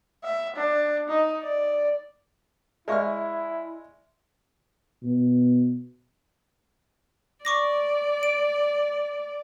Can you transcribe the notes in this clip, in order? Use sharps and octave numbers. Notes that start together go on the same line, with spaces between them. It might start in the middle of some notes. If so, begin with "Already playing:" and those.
E5
D4
D#4
D5
G#3 E4 D5 E5 F5 C#6 F6
B2
D5 C#6 D6 A#6
D7